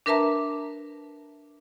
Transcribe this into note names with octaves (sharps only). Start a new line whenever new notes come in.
D4 A#4 B4 E5 A5 A#5